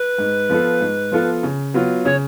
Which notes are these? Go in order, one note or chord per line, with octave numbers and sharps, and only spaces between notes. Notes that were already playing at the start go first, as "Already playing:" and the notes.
Already playing: B4
G#2
F3 B3 F4 A4
G#2
F3 B3 F4 A4
C#3
F#3 B3 F4
C#3 C#5